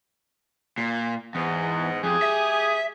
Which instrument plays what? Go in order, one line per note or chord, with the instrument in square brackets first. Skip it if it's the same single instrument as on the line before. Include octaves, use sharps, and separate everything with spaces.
[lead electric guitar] A#2
[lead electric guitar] E2 [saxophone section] G#2 B3
[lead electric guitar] F2 [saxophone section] G#3 G4 G#4
[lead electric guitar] E5